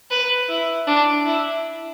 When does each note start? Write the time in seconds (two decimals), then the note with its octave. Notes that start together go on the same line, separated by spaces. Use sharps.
0.11 B4
0.49 E4
0.87 D4
1.26 E4